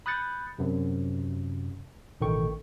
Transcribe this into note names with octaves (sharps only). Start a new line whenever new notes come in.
B5 D#6 F#6 G6 A6 C#7
F#2 C3
A1 B2 D#3 A4 G5 C#6